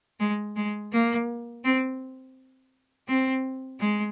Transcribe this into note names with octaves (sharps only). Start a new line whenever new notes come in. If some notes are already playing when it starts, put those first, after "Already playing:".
G#3
G#3
A#3
C4
C4
G#3